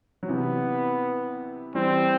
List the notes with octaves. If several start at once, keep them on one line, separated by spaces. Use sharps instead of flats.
F#3
C3 E3 B3
E3 G3 C4